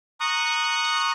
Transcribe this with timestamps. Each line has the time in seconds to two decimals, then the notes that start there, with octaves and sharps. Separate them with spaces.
0.20 A#5 C#6 D#6 F#6